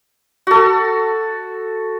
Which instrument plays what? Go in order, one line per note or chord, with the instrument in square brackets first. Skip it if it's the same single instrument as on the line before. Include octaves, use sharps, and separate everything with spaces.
[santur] F#4 A4